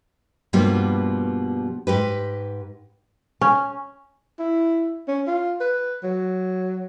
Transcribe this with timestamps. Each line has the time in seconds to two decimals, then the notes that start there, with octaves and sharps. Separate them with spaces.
0.53 G2 B2 F3 G3 A#3 B3
1.87 G#2 G4 B4
3.41 C#4
4.39 E4
5.08 C#4
5.27 F4
5.61 B4
6.03 F#3